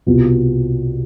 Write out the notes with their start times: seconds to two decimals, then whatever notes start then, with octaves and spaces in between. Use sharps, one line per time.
0.06 C2 B2 B3 F4